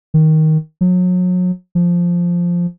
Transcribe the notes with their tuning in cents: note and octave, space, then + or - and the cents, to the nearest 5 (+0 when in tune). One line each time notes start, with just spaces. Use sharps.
D#3 +10
F#3 -35
F3 +0